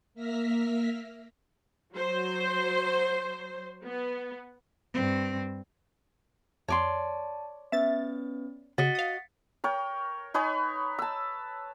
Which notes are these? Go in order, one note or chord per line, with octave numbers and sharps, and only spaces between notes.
A#3 E5 F6 A#6 B6
F#3 C5
B3
G2 C4
F2 C#5 D5 A5 C6
B3 C#4 B4 E5 A6
C#3 F#4 D#5 A6 B6 C#7
F5 D#6
A#4 C#5 G5
D#4 B4 C#5 G#5
A5 E6